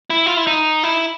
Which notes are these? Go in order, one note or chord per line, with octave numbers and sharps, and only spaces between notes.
E4
F4
E4
D#4
E4